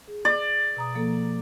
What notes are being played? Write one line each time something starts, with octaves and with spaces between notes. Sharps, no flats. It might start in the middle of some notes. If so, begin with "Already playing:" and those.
G#4
D5
B2 A#5 D#6
F3 A#3 A4